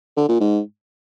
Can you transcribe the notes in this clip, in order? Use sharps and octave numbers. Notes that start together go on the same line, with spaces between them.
D3
A#2
G#2